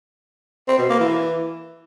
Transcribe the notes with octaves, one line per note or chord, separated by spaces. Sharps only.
C4
B2
A#3
E3